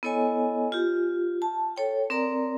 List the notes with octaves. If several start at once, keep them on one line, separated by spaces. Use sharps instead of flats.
B3 E4 A4 C#5 D#5 G#5
F4 G4
A5
A4 C#5 G5
C4 A#4 D5 A#5